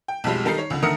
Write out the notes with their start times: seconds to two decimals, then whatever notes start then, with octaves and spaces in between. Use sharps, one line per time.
0.08 G5
0.24 B1 F2 G3 G#3
0.45 D#3 G3 D#4 A4 A#5 C7
0.58 C#5
0.70 C#2 D3
0.82 D3 D#3 A3 A#4 D#6 C#7